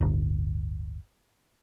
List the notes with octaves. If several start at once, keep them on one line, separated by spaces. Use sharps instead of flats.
D1 G1